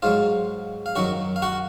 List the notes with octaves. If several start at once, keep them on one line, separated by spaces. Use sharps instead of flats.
G#2 F#3 F4 F5
F5
F#2 D#3 F#3 F#4 F#5
F5
F#4 F#5